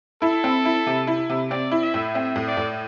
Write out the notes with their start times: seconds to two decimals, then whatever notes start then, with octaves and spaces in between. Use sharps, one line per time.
0.22 E4 A4
0.44 C4
0.65 E4
0.87 C3
1.07 E4
1.29 C3
1.50 C4 D5
1.71 E4
1.82 E5
1.94 A2
2.15 C4 E5
2.36 A2
2.47 D5
2.57 A2